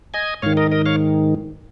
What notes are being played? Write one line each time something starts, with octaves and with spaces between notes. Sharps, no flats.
D#5 G#5
G#2 D#3 C#5 F5
A#4 D#5
A#4 D#5
C#5 F5